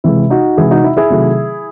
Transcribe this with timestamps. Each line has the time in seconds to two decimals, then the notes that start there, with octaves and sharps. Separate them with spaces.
0.04 C3 E3 G#3 E4
0.30 D#4 F#4
0.57 C3 E3 G#3 E4 G#4
0.71 D#4 F#4
0.84 E4
0.97 E4 G#4
1.10 C3 D#3 F#3 A3